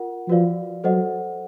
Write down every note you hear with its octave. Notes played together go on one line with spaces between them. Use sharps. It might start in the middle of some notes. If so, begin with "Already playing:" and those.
Already playing: F4 A#4 F#5
F3 F#4 B4 D5 F5
F#3 A4 C5 D#5 F#5